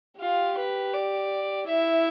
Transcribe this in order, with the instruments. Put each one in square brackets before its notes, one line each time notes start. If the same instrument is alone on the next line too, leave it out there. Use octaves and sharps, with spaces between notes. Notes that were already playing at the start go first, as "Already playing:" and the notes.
[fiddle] F4 [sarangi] G4
[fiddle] B4
D5
[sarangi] E4 [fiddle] E5